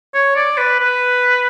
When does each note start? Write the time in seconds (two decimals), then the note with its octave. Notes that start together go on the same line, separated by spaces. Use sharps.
0.14 C#5
0.36 D5
0.58 B4
0.80 B4